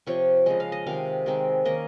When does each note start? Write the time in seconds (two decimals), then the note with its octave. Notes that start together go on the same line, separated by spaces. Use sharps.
0.07 C3 F3 C4 C#5
0.46 C#3 F3 G#3 D#5
0.60 F5
0.72 D#5
0.87 C3 D#3 G#3 F5
1.26 D#3 G#3 C4 D#4
1.65 D#3 A#3 C#4 D#5